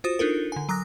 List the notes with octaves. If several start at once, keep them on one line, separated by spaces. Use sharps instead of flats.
F4 F#4 C5 D#6
D4 D#4 F4 A4 A#4
D3 G#5
F#3 A#5 D#6 F#6 A#6